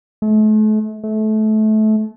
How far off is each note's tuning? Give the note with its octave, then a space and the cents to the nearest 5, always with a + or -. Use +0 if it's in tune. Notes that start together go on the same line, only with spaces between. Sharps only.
A3 -40
A3 -25